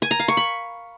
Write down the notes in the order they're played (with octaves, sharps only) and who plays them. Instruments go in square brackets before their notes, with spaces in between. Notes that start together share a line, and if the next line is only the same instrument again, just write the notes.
[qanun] G#5
A#5
F5
C#6
B5